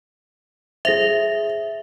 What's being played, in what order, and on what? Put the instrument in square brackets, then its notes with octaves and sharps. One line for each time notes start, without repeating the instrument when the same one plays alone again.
[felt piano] G#4 C5 [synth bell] E5 [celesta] A#6 F7